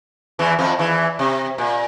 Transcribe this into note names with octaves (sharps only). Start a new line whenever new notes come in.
E2 E3
F2 F3
E2 E3
C3
A#2